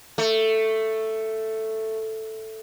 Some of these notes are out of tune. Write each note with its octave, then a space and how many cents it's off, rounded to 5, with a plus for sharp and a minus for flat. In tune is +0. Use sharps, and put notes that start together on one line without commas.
A3 +5